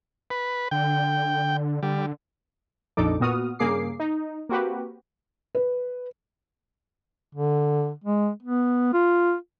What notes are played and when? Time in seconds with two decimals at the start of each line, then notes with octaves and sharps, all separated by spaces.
0.30 B4
0.71 D3 G5
1.83 D3 G3
2.97 A#1 F2 D4 D#4 A4 D6
3.20 A#2 B3 F#4 D#6 F6
3.59 G2 C#3 A#3 G#4 D6 C7
4.00 D#4
4.49 A#3 C4 F#4 G4 B4
5.55 B4
7.35 D3
8.04 G#3
8.43 B3
8.93 F4